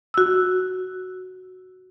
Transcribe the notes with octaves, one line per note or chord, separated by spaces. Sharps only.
F#4 E6